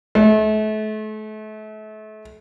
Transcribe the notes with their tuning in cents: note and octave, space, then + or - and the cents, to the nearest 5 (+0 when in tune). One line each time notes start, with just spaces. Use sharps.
A3 -35